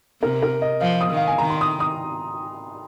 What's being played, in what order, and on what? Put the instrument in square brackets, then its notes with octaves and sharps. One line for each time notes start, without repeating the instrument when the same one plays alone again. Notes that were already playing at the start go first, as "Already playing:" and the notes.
[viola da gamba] C3 [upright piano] A#4
[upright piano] A#4
D#5
[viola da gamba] F3 [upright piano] F5
[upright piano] D#6
[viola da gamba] D#3 [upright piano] F5
[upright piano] G#5
[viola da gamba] D#3 [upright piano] A#5
[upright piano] C6
D#6
D#6